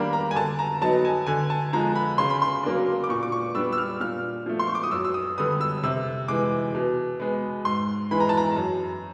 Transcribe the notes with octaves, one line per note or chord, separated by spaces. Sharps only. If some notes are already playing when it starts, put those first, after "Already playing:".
Already playing: D#3 G3 A#3 D4 A#5 B5
A#5
G#5
D3 A5
A#5
F#3 B3 D#4 A5
G#5
D3 G#5
A5
F3 G#3 A#5
B5
C#3 C6
B5
C6
F#3 A#3 D4
D6
A#2 C#6
D6
C#6
G3 B3 D4 E6
E6
F6
A#2 F6
F3 A3
C6
C#6
D6
D#6
F#2 E6
E6
D#6
D3 G3 B3 D#6
E6
C3 E6
E3 G#3 D6
B2
G#3 B3
G#2 C6
E3 G#3 B5
A#5
A5
A#5
F#2